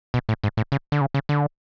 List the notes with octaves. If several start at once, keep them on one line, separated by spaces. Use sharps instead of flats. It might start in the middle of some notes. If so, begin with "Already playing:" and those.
B2
A2
G#2
A2
C#3
D3
C#3
C#3
D3